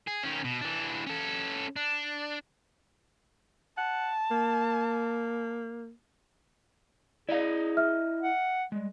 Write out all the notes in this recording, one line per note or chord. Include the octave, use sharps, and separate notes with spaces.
G#4
D#3 C#4
B2
E3 D4
C#4 A4
D4
F#5 A5
A#3
E4 G#4 D5 D#5 F5 A#5
E5 F6
F#5
G3 G#3